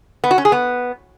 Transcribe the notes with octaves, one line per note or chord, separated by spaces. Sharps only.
B3
F#4
C#4
G#4
B3